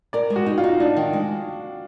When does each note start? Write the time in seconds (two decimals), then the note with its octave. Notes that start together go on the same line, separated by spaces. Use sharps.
0.13 A#4 D5
0.30 G#3
0.36 F#4
0.46 D#4
0.58 F4
0.64 D#4
0.80 D4 D#4
0.97 D#3
1.13 G#3